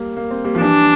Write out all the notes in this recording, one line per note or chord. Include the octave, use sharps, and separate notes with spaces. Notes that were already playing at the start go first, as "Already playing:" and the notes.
Already playing: G3 A#3
A#3
C4
G3 A#3
F3
E3 G3 D4